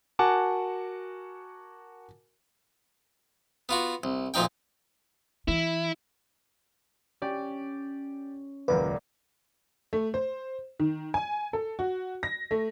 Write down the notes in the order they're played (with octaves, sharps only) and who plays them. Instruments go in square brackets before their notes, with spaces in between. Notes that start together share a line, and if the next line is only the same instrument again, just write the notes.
[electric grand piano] F#4 A#4 F#5 G#5 A5 D6
[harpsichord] B3 F4 F#4
C2
D2 A#2 F3 D#4 G5
[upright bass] E3 [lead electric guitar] E4
[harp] C#4 [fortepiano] G4 D5 G5
[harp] D#1 D5 [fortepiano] C#2 F#2 A#3 [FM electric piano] B4
[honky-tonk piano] A3
C5
D#3
G#5
A4
F#4
A#6
A3